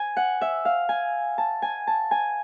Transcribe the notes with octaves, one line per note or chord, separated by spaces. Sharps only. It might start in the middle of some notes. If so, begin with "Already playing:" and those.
Already playing: G#5
F#5
E5
F5
G#5
A5
G#5
A5
G#5